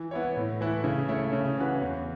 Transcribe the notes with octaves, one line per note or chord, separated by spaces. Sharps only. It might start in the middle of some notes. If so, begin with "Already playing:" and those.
Already playing: E3
B3 E4 C#5
A2
E3 A3 E4 B4
C#3
A3 E4 C#5
C#3
E3 C#4 F#4 B4
E2